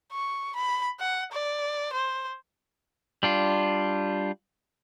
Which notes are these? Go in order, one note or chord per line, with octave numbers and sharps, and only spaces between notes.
C#6
B5
F#5
D5
C5
G3 D4 F4